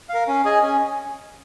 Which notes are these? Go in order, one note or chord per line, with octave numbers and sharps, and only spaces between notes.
A#4 F5
C#4
G#4 D#5 G#5
C#4